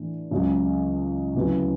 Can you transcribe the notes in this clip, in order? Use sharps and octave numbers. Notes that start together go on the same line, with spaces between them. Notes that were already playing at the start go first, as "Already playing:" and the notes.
Already playing: A2 E3 D4
C#2 C#3 F#3
D2 C#3 F#3 B3 E4